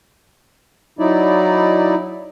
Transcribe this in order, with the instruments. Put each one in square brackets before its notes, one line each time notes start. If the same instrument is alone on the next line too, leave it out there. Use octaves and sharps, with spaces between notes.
[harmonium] F#3 D#4 E4 D5